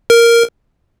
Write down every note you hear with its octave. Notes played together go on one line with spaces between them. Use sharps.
A#4